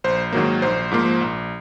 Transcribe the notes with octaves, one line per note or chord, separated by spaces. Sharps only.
A#1 C5
G#2 D#3 F#3 A#3
A#1 C5
G#2 F3 A#3
A#1